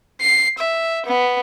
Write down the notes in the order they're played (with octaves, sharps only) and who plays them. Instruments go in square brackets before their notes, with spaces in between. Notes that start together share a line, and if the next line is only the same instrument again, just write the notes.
[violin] C7
E5
B3